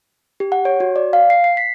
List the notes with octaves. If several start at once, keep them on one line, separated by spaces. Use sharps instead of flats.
G4
F#5
C#5
F#4
D5
F5
C7
C7
B6